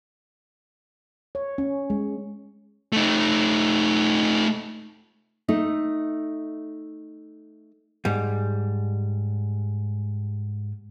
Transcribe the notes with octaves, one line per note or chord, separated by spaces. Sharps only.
C#5
C#4
G#3
A3 D#4
A3 D#4
G#2 G3